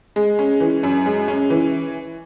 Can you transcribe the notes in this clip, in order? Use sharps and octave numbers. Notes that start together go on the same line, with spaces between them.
G#3
C#4
E3
F#2
G#3
C#4
E3